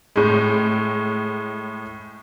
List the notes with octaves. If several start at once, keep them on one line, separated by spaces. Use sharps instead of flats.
A2 G#3